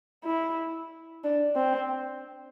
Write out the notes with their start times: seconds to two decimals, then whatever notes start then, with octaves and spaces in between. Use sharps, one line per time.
0.24 E4
1.24 D4
1.56 C4